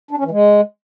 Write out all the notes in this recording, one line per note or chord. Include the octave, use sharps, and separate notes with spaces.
D4
C#4
E3
G#3